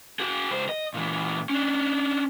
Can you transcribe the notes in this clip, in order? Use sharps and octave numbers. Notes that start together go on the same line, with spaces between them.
F#4 G#4
C#2 C5
D#5
A#2 E3
C#4 D4